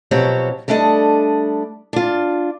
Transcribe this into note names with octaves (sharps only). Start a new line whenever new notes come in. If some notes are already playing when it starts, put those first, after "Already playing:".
B2 F3 F#3 C4 G4 C#5
G3 A3 D4 A4 D#5
D4 F4